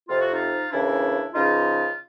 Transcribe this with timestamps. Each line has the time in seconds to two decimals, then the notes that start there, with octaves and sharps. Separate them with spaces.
0.08 F2 C3 F3 F4
0.20 F#4
0.33 D#4 F4
0.71 D#2 C#3 E3 D4 E4
1.33 C#2 C#3 F3 D#4 F4